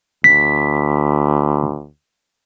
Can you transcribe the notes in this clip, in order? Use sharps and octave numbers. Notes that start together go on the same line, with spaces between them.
D2 B6